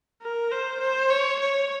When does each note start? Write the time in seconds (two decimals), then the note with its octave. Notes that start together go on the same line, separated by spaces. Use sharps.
0.22 A#4
0.52 C5
0.80 C5
1.10 C#5
1.40 C#5